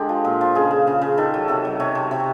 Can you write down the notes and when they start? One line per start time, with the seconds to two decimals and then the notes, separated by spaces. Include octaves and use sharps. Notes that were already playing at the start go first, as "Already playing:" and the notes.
Already playing: D3 G#3 G4
0.09 F3
0.25 A#2
0.41 F3
0.55 C#3 G#4
0.71 C#3
0.87 C#3
1.02 C#3
1.18 D#3 A4
1.34 F#3
1.48 C3 A4
1.65 F#3
1.80 C3 C#5
1.95 C3
2.11 C3